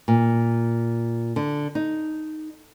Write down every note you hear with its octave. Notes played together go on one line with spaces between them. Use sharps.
A#2
D3
D#4